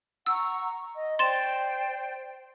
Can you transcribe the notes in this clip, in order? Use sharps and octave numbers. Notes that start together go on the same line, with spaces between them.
F#5 A#5 C#6 E6
D#5
C5 D5 G5 C6 A6 E7